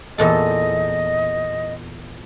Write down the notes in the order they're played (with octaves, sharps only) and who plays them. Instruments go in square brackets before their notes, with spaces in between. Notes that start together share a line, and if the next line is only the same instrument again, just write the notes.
[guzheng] E2 A#2 A4 [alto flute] D#5